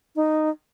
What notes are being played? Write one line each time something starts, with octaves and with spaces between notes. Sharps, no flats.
D#4